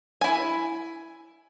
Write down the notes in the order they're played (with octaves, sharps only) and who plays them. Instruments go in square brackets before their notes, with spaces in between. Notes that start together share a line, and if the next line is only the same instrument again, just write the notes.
[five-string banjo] E4 G#5